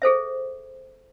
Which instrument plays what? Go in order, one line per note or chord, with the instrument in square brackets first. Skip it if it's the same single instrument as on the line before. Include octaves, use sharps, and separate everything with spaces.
[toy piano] G#4 A4 C5 E5